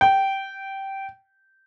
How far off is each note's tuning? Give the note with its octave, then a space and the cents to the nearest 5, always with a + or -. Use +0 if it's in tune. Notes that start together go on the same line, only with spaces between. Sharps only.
G5 -15